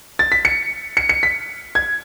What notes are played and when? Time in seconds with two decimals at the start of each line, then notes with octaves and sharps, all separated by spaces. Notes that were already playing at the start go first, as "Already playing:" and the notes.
0.19 A6
0.32 B6
0.45 C#7
0.97 C#7
1.09 C#7
1.23 B6
1.75 G#6